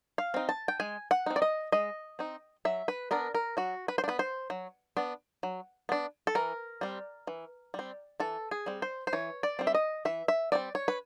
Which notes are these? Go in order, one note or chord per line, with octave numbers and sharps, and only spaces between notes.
F5
C4 D#4
A5
G5
G#3 G#5
F#5
C4 D#4
D5
D#5
G#3 D#5
C4 D#4
F#3 E5
B4
B3 D4 A#4
A#4
F#3 F#4
B4
C5
D4
B3 B4
C5
F#3
B3 D4
F#3
B3 D4
A4
E3 A#4
G3 C4
E3
G3 C4
E3 A4
G#4
G3 C4
C5
C5
E3 C#5
D5
G3 C4
E5
D#5
E3 E5
E5
G3 C4 D#4 D5
C#5
B4